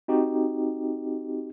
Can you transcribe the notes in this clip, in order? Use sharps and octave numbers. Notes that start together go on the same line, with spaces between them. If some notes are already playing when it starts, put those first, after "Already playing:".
C4 D#4 F#4 G4